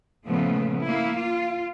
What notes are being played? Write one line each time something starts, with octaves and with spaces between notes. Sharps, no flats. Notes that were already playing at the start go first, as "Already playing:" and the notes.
A#2 C#3 F3 A3 B3
A#3 E4
F4